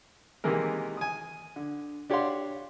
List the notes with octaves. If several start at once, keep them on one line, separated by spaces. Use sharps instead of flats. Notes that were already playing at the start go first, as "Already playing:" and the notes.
C3 D#3 E3 G#3 A#3 A#4
G#5 D#6
D3
D4 G4 C#5 F5 F#5 C6